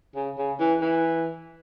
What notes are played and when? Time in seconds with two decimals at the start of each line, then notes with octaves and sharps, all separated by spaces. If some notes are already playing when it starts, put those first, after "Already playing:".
0.16 C#3
0.38 C#3
0.60 E3
0.81 E3